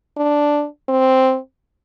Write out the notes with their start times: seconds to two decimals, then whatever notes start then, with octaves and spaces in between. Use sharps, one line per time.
0.17 D4
0.89 C4